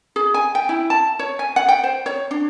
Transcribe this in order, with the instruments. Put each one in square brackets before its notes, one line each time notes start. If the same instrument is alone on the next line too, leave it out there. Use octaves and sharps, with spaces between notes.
[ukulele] G#4
G#5
G5
E4
A5
C#5
G#5
F#5
G5
C5
C#5
D4